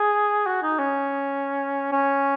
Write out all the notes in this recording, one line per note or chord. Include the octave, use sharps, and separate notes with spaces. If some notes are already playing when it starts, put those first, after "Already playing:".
Already playing: G#4
F#4
D#4
C#4
C#4